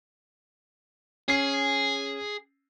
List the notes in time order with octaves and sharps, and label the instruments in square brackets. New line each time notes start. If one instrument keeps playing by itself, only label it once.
[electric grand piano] C#4 C7 [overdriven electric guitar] G#4